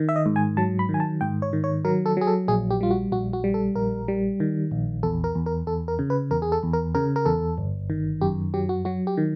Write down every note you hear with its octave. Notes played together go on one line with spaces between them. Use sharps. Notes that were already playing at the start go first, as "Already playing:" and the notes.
Already playing: D#3
E5
D#5
G#2
G#5
F#3 A5
B5
D#3
G#5
A5
G#2 G5
C#5
D#3
C#5
F#3 A#4
A4
F#3 G#4
A4
A#1 G#4
G4
G3 F4
F#4
A#1 F#4
F#4
G3
A4
A#1 A#4
G3
D#3
A#1
E2 A4
A#4
E2
A#4
E2 A4
A#4
C#3
B4
E2 A#4
G#4
A4
E2
A#4
C#3 A#4
A#4
E2 A4
G1
D#3
F#2 G4
F#3 G4
F#4
F#3 F#4
G4
D#3